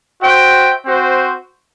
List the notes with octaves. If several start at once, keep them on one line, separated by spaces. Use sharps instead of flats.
F#4 C5 E5 G5
C4 F#4 C5